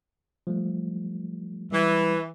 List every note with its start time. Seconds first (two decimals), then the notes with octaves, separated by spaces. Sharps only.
0.47 F3 G3 A3
1.72 E3 G3